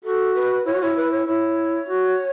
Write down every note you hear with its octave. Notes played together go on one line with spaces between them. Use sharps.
F#4 A4
B4
E4 C#5
F#4
E4 C#5
B4
C#5
E4 C#5
F#4